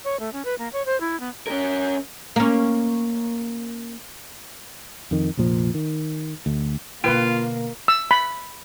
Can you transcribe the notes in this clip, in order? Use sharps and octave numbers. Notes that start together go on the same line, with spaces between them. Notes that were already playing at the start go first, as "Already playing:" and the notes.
C#5
A3
C#4
B4
A#3
C#5
C5
E4
B3
C#4 A#4
A#3 C#4
F2 D#3
F1 A#1 A#2 F3
D#3
D2
B2 D3 A#3 F4 B4 G5
E6
B5